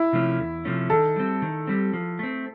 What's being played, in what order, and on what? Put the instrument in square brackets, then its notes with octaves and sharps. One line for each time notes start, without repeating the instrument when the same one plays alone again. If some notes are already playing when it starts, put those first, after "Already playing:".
Already playing: [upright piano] E4
[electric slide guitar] C3 F3 A3 C#4
E2
C3 F3 A3 C#4
[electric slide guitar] D#3 [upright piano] A4
[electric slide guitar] G3 C4
D#3
G3 C4
F3
A3 C4